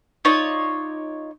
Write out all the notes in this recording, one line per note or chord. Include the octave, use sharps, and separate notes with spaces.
D#4 F4 C#5 D5